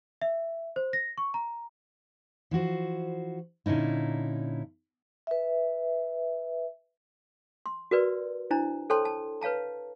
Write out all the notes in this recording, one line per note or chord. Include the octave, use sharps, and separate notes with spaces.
E5
C5
A#6
C#6
A#5
E3 F3 F#4 C5
A#2 D3 C#4 D#4 E4
B4 E5
C6
F#4 A#4 B4 D5
D4 E4 C5 A#5
A4 C5 C#5 G5 A5 C6
A5
B4 C#5 F5 A5 A#5